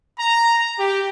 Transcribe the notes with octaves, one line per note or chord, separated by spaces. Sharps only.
A#5
G4